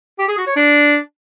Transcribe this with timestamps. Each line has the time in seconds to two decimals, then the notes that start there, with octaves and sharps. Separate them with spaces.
0.19 G4
0.28 G#4
0.38 F#4
0.47 C#5
0.56 D4